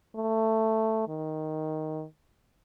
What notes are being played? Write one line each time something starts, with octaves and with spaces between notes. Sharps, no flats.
A3
D#3